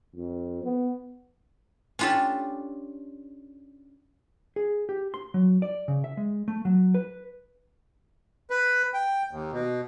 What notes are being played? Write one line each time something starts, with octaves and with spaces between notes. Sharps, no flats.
F2
B3
C#4 D4 F4 G4 A4
G#4
G4
C6
F#3
D5
C#3
E5
G#3
A3
F#3
B4
B4
G5
D#2
B2